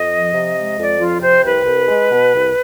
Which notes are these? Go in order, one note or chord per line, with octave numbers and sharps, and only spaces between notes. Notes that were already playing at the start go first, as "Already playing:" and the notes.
Already playing: F2 D#5
F3
C3
G#3
F2 D5
F3 F4
C3 C5
C2 B4
C2
G#3
B2
C2